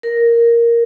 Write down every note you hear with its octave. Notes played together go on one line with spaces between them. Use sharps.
A#4
A#4